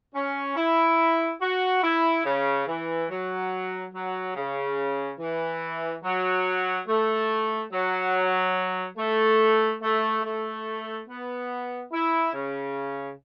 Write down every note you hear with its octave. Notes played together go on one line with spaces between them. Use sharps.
C#4
E4
F#4
E4
C#3
E3
F#3
F#3
C#3
E3
F#3
A3
F#3
A3
A3
A3
B3
E4
C#3